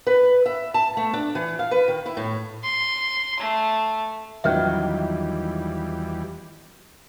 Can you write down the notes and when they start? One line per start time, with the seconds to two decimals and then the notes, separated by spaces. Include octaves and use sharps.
0.07 B4
0.46 E5
0.74 A5
0.97 A3
1.13 D4
1.35 E3
1.59 F5
1.71 B4
1.88 D#3
2.06 E4
2.17 A2
2.64 C6
3.40 A3
4.44 E2 D#3 F#3 G3 C#4 F4 B4 E5